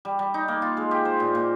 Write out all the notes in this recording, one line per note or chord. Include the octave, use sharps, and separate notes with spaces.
G3
G3
D#4
A#3
F4
G#3
G4
C5
A#2
A#2